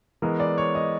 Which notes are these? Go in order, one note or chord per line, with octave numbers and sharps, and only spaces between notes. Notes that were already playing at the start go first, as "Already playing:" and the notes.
E3 G#3 B3 A#4
D5
C#5
D#5